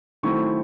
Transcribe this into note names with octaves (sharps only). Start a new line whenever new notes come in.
D#3 F#3 A3 C4 E4 C#6